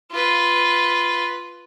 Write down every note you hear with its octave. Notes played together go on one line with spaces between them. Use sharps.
F4 B4